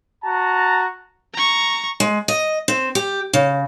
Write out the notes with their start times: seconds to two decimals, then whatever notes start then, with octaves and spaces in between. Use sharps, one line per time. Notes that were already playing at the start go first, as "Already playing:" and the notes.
0.24 F#4 A5 A#5
1.33 A#5 C#6
2.00 G#3
2.28 D#5
2.68 C4
2.95 G4
3.33 C#3